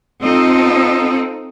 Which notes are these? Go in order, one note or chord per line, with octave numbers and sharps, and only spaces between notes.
C4 D#4 F4 A4 D#5